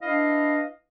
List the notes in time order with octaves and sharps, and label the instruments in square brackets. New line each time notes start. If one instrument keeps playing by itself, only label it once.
[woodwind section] D4 E4 B4 D#5 F5